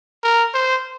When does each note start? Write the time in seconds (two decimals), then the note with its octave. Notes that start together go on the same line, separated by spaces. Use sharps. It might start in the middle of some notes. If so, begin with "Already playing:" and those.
0.23 A#4
0.54 C5